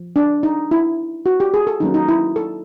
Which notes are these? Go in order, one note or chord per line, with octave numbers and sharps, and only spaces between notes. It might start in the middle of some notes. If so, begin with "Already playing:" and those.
Already playing: F3
D4
D#4
E4
F#4
G4
G#4
A4
D#3 F#3 A#3 C#4 D#4
D#4
E4
A4